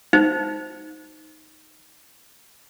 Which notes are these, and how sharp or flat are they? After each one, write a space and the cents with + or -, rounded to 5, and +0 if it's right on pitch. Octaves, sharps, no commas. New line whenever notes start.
D#4 +0 C5 +0